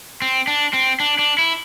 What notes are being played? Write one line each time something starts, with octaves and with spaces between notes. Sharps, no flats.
C4
D4
C4
D4
D4
E4